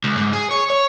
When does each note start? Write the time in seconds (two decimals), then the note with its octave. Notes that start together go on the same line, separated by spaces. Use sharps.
0.04 C#2
0.18 G#2
0.33 G#4
0.51 C#5
0.70 C#5